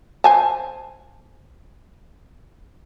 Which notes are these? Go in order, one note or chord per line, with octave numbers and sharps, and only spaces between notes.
C5 G#5 A5